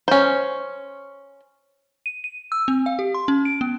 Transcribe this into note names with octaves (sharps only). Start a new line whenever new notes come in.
C#4 C5
D#7
D#7
E6
C4
F5
G4
C6
C#4
D7
B3